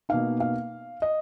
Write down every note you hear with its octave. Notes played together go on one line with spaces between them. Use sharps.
B2 A#3 D#4 F5
F5
D#5